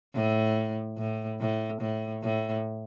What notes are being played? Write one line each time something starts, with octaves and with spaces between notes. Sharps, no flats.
A2
A2
A2
A2
A2